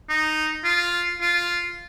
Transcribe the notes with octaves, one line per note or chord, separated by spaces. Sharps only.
D#4
F4
F4